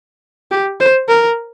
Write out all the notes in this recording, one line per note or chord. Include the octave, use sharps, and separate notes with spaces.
G4
C5
A#4